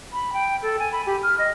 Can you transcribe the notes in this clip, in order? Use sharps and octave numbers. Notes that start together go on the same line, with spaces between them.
B5
G5
A4
G#5
B5
G4
F6
D#5